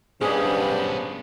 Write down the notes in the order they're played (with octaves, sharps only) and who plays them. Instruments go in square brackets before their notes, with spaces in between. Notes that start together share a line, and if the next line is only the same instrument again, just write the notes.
[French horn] G2 [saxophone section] F3 D4 C5 [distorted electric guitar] B3 C#4 [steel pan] G#4